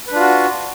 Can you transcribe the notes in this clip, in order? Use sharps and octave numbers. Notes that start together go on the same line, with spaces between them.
D4 F4 F#4 B4